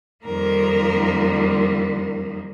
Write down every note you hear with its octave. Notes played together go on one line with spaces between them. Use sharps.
F2 D#3 G3 A#3 A#4